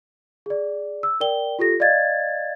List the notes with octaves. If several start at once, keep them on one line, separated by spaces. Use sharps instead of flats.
G#4 D5
E6
A#4 D5 G5 G7
F4 G4 A4 A#6
D5 D#5 F5 G#6 A6